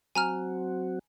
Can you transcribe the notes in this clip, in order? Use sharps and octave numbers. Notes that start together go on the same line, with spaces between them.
F#3 C4 F#4 G#5 A#5 F6